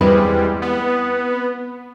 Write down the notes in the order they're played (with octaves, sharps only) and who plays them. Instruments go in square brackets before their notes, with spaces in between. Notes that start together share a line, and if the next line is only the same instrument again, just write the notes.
[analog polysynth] E2 G3 G#3 [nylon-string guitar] C4 E4 B4
[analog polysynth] B3